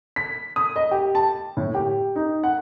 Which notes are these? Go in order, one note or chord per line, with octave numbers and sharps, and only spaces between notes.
B6
D#6
D#5
G4
A5
A2
G4
D#4
F#5